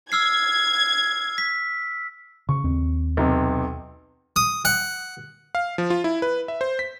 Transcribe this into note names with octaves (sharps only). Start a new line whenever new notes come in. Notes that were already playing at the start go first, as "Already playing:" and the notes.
E6 F6 G#6 C7
B6
C#3 C#6
D#2 C4
B1 C3
D#6
F#5
F5
F3
F4
E4
B4
E5
C5
B6